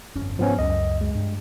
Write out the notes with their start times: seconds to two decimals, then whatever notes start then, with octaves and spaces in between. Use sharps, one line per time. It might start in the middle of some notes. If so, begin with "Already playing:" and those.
0.16 G1 F2 C#4
0.39 G#2 F3 B3 C#4
0.59 C#2 F#2 D#5
1.01 G#3
1.15 G2